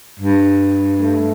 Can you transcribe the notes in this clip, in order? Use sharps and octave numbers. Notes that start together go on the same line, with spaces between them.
G2
A3